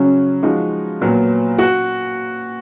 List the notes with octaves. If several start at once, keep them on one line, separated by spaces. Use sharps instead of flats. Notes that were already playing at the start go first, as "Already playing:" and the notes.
Already playing: C#3 F#3 C#4
F3 G#3 D#4 F#4
A#2 F#3 B3
F#4